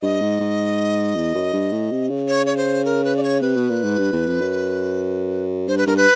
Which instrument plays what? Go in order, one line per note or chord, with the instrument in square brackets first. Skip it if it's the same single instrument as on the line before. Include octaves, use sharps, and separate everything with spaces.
[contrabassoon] G2 [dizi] D#5
[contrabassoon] G#2
G#2
E2
F#2
G2
A2
C3
C#3
[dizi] C#5
C#5
C5
A#4
B4
D5
C#5
[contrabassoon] C3 [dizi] B4
[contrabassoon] B2
A#2
G#2
G2
E2
F2
F#2
[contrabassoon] G2 [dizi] C5
[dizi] B4
[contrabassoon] G2 [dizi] A#4
[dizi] B4